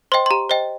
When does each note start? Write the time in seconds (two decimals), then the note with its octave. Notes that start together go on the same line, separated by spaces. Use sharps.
0.12 C5 D#5 G5 C6
0.26 C6
0.31 G4 A#5
0.50 C5 D#5 G5